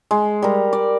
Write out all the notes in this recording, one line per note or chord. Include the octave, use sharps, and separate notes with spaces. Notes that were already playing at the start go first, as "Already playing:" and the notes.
G#3
G3 A#4
D5